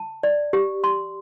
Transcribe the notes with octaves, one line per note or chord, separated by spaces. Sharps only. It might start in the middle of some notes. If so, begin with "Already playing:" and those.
Already playing: A5
D5
G4
C6